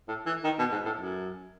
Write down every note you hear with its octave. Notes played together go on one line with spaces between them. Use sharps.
A2
E3
D#3
B2
G#2
A2
F#2